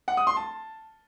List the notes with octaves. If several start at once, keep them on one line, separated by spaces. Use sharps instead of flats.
F#5
D#6
C6
A5